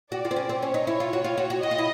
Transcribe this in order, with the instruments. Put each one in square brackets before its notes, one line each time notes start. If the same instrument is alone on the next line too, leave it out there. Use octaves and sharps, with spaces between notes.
[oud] F#4 [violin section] D5
[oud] F4
C4
C#4
C4
[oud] C#4 [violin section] C#5
[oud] D#4
E4
F4
F#4
F4
F#4
F#4
[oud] F#4 [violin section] D#5
[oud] F4
E4